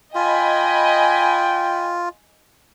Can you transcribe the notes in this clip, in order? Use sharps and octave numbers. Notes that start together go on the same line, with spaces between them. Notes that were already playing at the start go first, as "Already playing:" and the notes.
F4 D#5 G5 G#5 B5